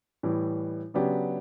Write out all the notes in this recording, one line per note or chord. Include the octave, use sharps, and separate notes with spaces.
A2 E3 G3
C#3 F#3 B3 D4 G4